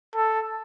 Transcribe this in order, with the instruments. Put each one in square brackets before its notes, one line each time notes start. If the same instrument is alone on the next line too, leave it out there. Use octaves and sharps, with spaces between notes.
[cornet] A4